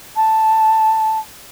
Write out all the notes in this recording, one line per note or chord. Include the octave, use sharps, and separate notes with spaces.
A5